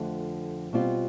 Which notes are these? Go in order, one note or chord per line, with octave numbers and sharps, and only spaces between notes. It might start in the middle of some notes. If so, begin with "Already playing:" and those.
Already playing: F2 D3 F3 A3
B2 G3 C4 F4